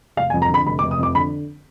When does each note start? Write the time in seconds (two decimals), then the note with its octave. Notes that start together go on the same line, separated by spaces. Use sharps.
0.17 F1 F5
0.30 G#5
0.34 F2
0.42 A#5
0.49 D3 B5
0.66 F1 B5
0.79 D6
0.83 F1
0.91 D#6
0.99 F2 D6
1.15 D3 B5